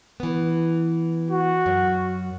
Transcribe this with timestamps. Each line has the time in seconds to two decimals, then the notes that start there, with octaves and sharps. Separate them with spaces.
0.20 E3 B3
1.31 F#4
1.66 F#2